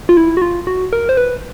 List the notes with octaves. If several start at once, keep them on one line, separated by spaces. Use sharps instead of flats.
F4
E4
F#4
F4
F#4
A#4
C5
B4